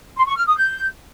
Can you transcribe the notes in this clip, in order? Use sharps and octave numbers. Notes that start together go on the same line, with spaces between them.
C6
C#6
F6
D#6
G6